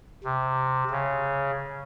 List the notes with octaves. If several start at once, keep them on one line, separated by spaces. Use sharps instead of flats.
C3
C#3